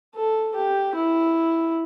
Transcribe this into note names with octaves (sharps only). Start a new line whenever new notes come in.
A4
G4
E4